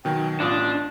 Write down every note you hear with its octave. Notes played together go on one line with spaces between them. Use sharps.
B2 D#3 F#3 G5
A1 B3 D4 F4 D#6